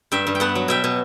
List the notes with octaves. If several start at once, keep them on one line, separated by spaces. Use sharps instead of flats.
G2 E5 G5
G2
G5
B3 F#5 A5
F#3
B2 E5 G5
B2